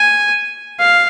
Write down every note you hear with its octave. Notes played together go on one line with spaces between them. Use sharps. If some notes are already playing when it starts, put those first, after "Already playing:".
Already playing: G#5
F5